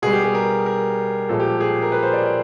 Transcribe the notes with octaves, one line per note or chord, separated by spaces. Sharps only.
B2 G3 G#4
G4
G#4
A#4
A#4
A#2 F3 G#3 A4
G4
G#4
A#4
B4
C5
D5
D5